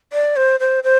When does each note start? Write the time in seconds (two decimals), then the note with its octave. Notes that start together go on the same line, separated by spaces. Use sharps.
0.13 D5
0.36 C5
0.60 C5
0.84 C5